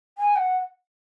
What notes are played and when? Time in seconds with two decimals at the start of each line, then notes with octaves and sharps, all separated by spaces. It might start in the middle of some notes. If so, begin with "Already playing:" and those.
0.18 G#5
0.36 F#5